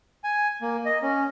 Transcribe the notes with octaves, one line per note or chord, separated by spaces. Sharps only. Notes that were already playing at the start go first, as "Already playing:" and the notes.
G#5
A#3
D#5
C#4